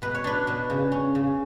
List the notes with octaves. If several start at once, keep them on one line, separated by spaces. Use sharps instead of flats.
B2 B4
C#5
D4 B4
B2
C#3
C#4
C#3